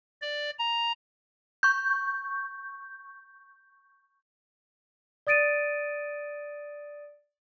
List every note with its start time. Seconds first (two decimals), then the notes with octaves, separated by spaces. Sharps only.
0.22 D5
0.59 A#5
1.63 C#6 G6
5.27 D5 D#6 A6 D7 D#7